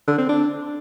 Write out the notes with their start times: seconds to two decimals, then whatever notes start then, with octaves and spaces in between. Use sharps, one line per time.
0.08 D3
0.19 C4
0.29 D4